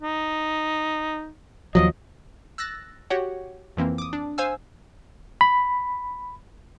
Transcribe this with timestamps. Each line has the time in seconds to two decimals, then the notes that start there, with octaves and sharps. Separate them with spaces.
0.03 D#4
1.75 D#2 F3 F#3 D#5
2.58 E6 F#6 A6 A#6
3.10 F#4 G4 C#5 F#5
3.77 F2 E3 A#3 C4
3.98 D6 D#6
4.13 D4
4.38 C5 F5 G#5 E6
5.41 B5